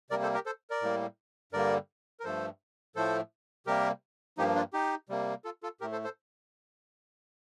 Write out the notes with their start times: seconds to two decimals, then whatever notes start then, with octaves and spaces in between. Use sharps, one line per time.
0.10 C3 G3 A#3 A#4 D5
0.23 A4 C5
0.34 G4 A#4
0.46 A4 C5
0.70 A#4 D5
0.82 A2 G3 A#3
1.52 G2 D3 G3 A#3 A#4 D5
2.20 A#4
2.24 G2 F3 A3 A4 C5
2.95 A2 F3 A3 A4 C5
3.66 C3 G3 A#3 G4 A#4
4.37 G2 F3 A#3 D#4 G4
4.55 D4 F4
4.73 D#4 G4
5.09 C3 G3 A#3
5.44 F4 A4
5.63 F4 A4
5.81 A2 A3 G4 A#4
5.92 A4 C5
6.04 A4 C5